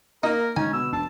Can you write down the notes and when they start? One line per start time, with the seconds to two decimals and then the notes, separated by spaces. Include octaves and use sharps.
0.24 A#3 D#4 A#4
0.57 D3 G#3 C#4 D#4 G#5
0.73 B2 E6
0.93 E1 D4 A5